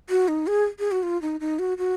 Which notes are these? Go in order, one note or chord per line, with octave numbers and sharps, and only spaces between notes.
F#4
D#4
G#4
G#4
F#4
F4
D#4
D#4
F#4
F#4